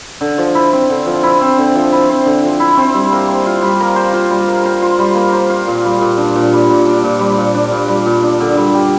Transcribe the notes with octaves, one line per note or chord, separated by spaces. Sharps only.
D3
F3
E4
C4
D3
F3
E4
C4
D3
F3
E4
C4
D3
F3
E4
C4
G3
A#3
C5
F4
G3
A#3
C5
F4
G3
A#3
C5
F4
G3
A#3
C5
F4
A#2
G3
A#2
D4
A#2
G3
A#2
D4
A#2
G3
A#2
D4
A#2
G3
A#2
D4
D3
G3
G4